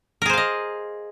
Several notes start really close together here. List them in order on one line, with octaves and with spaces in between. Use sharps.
A#4 G#4 C5 F5 D#5